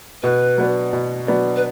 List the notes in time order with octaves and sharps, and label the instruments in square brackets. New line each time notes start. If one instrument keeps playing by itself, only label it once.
[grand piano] B2 [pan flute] B4
[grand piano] F#3 B3 D4
B2
F#3 B3 D4
[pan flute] B4